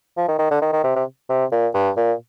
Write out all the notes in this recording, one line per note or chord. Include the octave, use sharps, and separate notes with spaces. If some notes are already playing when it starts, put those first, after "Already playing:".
F3
D#3
D#3
D3
D#3
D#3
C3
C3
C3
A#2
G2
A#2